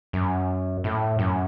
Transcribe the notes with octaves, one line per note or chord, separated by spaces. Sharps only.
F#2
A2
F#2